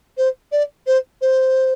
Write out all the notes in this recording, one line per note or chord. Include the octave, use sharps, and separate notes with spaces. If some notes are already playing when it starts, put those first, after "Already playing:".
C5
D5
C5
C5